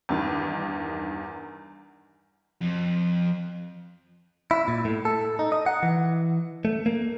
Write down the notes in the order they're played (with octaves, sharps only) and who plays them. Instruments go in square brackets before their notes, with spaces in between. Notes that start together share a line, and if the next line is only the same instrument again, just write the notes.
[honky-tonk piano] E2 G2 D#3
[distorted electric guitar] F2
[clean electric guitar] E4
A#2
A2
A4
D#4
D#5
F#5
E3
A3
A#3